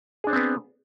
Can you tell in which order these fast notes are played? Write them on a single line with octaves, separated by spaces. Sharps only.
G#4 D4 C5 C4 B3